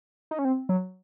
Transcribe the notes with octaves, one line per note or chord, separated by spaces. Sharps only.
D#4
C#4
C4
F#3